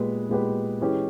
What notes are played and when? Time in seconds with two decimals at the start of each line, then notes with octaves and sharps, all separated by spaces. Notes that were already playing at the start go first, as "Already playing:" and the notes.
Already playing: A#2 G#3 B3 G4 B4
0.29 A#2 G#3 B3 G4 B4
0.81 E3 G#3 C#4 G4 B4